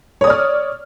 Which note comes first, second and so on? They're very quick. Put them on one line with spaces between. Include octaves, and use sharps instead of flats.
C#5 D#6 D5 F6